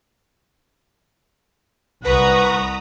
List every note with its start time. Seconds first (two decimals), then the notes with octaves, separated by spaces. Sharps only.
2.05 C2 B4 F#5 A#5 B5 C#6 D#6